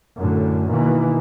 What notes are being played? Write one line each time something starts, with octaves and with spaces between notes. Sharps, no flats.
F#2 A2 D3
B2 D#3 E3 A#3